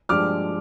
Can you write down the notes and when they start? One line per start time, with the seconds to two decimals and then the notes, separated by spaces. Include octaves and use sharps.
0.09 G2 F3 G#3 D4 G4 D6 F6